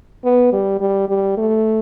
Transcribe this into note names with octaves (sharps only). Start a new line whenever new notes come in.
B3
G3
G3
G3
A3